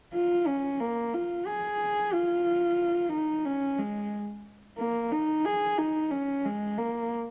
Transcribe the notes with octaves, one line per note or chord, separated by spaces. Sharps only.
F4
C#4
A#3
F4
G#4
F4
D#4
C#4
G#3
A#3
D#4
G#4
D#4
C#4
G#3
A#3